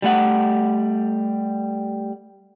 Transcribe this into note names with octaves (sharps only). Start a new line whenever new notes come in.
G3 A3 F#5